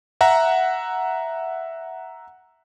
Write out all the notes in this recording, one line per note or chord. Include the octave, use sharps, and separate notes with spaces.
E5 F#5 A#5